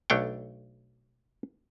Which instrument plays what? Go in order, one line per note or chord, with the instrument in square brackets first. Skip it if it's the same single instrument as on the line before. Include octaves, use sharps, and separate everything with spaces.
[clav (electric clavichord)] B1 A3 D4 C#5 G5